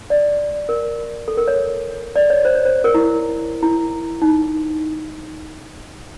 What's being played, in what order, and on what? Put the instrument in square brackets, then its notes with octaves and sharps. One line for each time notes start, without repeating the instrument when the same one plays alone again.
[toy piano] D5
A#4
A4
A#4
C#5
D5
C#5
C5
C#5
C5
A#4
E4
E4
D#4